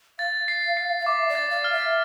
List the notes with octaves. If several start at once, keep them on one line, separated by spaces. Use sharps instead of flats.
F5 A6
C7
C7
F5
E5 D6
D5
A6
F5
F6
E5